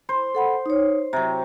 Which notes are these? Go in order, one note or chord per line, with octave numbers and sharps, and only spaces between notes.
C5
A4 F#5 B5
D#4 C#5
C3 F#3 A#5